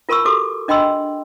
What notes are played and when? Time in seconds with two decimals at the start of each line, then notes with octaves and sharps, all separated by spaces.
0.09 F4 A#4 A5 B5 C#6 E6
0.25 F#4 G4 A4 D6
0.68 D4 D#5 G5 B5 C6 E6